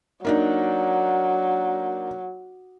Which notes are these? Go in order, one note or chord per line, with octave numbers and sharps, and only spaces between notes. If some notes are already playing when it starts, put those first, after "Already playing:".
F#3 A#3 D4 D#4